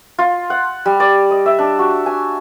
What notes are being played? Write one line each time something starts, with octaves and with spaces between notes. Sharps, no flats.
F4
F#5
G3
D5
D#5
E5
D4
F#4
G#5